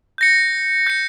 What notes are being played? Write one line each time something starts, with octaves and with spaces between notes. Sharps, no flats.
G6 A#6 C#7
G6 A#6 C#7